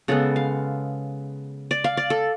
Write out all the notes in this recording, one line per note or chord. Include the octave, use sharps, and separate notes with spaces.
C#3 G#3 B3 A4
F5
D5
F5
D5
A4